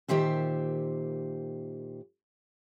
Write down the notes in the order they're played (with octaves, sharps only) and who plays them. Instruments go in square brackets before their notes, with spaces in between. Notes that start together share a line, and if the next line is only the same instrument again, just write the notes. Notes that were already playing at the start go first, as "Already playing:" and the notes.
[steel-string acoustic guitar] A#2 D#3 G4 C5 E5